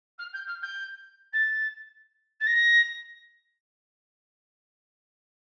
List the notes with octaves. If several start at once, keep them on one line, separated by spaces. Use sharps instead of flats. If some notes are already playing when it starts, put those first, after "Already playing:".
F6
G6
F6
G6
A6
A6
A#6